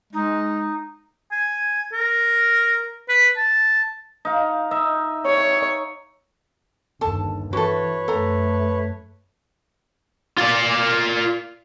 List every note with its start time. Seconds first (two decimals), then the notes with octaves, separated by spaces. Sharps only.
0.13 G#3 D#4
1.32 G#5
1.92 A#4
3.09 B4
3.37 A5
4.25 D#4 F5
4.71 D#4 E5
5.26 C#5
7.01 G1 D#2 A4 A5
7.53 E3 F#4 A4 B4 C#5
8.08 F#2 A3 A4 A#5
10.38 F4 D5